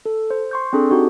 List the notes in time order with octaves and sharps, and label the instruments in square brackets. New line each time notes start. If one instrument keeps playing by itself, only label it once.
[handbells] A4
C5
C6 C#6 G6
C4 D4 G#4 A4
D#4 F#4 G4 A4